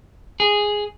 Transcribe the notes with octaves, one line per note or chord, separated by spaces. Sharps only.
G#4